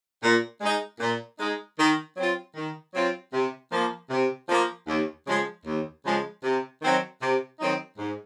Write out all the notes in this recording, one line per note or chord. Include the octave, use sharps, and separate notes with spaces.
A#2
G#3 D#4
A#2
G#3 D#4
D#3
F#3 C4 F4
D#3
F#3 C4 F4
C3
F3 A#3
C3
F3 A#3
D#2
C#3 F3 G#3
D#2
C#3 F3 G#3
C3
D#3 F#3 C4 D#4
C3
D#3 F#3 C4 D#4
G#2